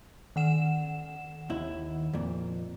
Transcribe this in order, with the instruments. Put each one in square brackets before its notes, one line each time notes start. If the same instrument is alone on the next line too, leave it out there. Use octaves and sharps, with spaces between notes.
[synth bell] D#3 F#5 E7
[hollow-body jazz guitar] D#2 E4
F2 A#2